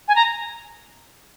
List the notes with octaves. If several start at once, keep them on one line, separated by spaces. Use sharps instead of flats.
G#5
A#5